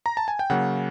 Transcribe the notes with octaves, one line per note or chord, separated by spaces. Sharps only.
A#5
A5
G#5
G5
C#3 F#3 A#3 F#5